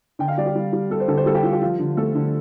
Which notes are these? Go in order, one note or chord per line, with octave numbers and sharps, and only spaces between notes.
D3 G5
F5
G3 D5
G4
G3
G3
G3 A4
C5
D3 A4
C5
G3 A4
G4
G3 F4
G4
F3 F4
D3
A3 A4
D3